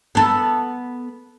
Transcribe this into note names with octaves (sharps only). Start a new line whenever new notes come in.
B3 A4